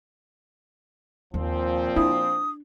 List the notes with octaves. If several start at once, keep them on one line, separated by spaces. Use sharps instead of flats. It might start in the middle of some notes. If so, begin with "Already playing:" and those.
D#2 A#2 F3 C4
D4 E4 D#6